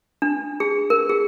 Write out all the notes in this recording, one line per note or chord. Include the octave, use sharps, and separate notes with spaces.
D4
G#4
A#4
G#4